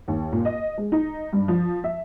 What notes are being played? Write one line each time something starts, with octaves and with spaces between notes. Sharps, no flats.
D#2
A#2
D#5
G#3
D#4
G2
F3
E5